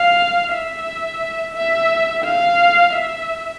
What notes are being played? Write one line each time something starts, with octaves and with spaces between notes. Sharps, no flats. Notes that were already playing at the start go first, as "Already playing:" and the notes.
Already playing: F5
E5
E5
F5
E5